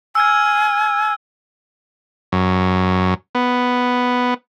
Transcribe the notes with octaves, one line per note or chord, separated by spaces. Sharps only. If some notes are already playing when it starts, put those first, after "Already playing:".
G#5 E6 F6 G#6
F#2
B3